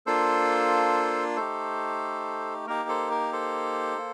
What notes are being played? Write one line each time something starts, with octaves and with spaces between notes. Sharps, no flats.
A#3 D4 F4 A4 C5
A3 D#4 G4 A4 C5
A#3 D#4 G4 A#4
A4 C5
A#4
A4 C5
A#3